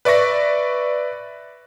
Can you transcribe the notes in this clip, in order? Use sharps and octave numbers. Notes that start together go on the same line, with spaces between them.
B4 D5 E5 C#6 A#6